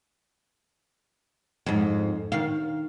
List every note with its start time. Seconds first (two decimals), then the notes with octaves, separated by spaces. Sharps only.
1.66 F2 G#2
2.32 D#3 F5